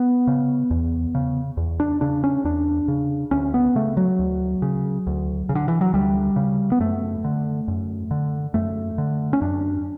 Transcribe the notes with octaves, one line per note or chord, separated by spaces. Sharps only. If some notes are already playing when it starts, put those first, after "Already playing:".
Already playing: B3
C#3
E2
C#3
E2
D4
C#3 D4
C#4
E2 D4
C#3
D2 C#4
B3
C#3 A3
F#3
D2
C#3
D2
C#3
D3
E3
F#3
D2 G3
C#3
B3
F#2 A3
D3
F#2
D3
F#2 A3
D3
C#4
F#2 D4